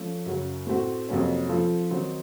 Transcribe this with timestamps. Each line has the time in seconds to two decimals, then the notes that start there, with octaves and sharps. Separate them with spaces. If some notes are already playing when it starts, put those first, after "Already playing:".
Already playing: F3 A3 C#4 A4
0.26 F#2 C#3 F#3
0.67 A2 A3 C4 F#4
1.09 F2 C3 F#3 A#3 C#4
1.49 F3 C4 F4 A4
1.90 D#3 F#3 C4 D#4